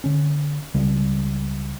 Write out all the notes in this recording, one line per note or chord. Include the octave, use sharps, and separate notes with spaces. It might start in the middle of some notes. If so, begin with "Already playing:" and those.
D3 C#4
C#2 C#3 G3